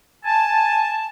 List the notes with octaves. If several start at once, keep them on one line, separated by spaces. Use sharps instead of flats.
G#5 A5